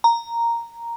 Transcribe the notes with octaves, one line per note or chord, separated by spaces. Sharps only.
A#5